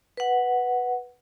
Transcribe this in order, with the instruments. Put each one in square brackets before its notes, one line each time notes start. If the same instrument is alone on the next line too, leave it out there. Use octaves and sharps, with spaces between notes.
[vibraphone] B4 F#5